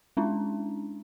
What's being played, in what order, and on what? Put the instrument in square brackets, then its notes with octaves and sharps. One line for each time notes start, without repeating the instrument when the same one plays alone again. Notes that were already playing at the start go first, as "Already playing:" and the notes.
[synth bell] G#3 C#4 D4 E4